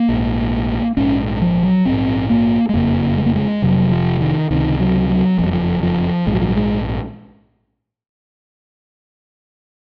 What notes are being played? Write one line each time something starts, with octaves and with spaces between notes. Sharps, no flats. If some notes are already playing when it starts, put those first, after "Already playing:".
Already playing: A#3
A#1 G#2
A#1 G#2 C#4
F3
F#3
A#1 G#2 C4
A#3
G#3
F#1 F2 C#3 A#3
G#3
A#3
G#3
F1 F2 C3 F#3
F3
D#3
C#2 C3 D#3
F#3
F#3
F#1 F2 C3 F3
F#3
F3
F3
A#1 G#2 G#3
F#3
F3
F#3
G#3